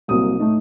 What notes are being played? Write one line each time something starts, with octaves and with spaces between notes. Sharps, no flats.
C2 C3 F#3 A#3 D#6
A2 A3 D#4